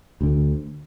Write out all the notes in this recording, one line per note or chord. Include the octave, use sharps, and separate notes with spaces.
D2 D3